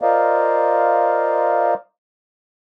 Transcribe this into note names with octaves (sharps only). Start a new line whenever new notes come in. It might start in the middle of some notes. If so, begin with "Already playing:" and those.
F4 A#4 C5 D5 D#5 F5